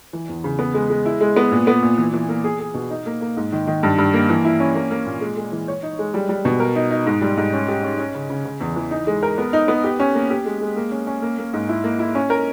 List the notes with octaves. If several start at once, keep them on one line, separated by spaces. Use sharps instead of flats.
E3
E2
C#3
B3
G#3
G#3
E4
G#3
B3
A#2
B3
A#2
E3
E3
A#3
G#4
G#4
B2
D#4
A#3
A#3
G#2
D#3
D#3
G2
G2
A#3
E3
E4
C#4
A#3
A#3
A#2
G#3
G#3
E3
C#5
D#4
G#3
G3
G3
B2
A#4
D#4
D#4
G#2
G3
G#2
C#4
G4
C#4
C#4
C#3
C#3
C#3
E2
E3
D#4
G#3
A#4
B3
D#4
B3
G4
C#4
A#3
G4
G#3
G#3
A#3
C#4
C#4
A#3
A#3
G#2
E4
A#3
E4
C#4
A#4